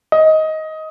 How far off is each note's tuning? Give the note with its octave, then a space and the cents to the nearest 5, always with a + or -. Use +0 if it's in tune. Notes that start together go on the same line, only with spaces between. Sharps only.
D#5 +15